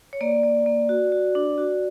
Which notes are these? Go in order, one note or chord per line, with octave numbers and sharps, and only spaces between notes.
C#5
A#3 D5
A#3
A#3
F#4
F#4
D4
F#4